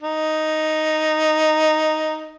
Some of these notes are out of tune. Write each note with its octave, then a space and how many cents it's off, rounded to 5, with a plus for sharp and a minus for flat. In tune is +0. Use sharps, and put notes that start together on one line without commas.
D#4 +0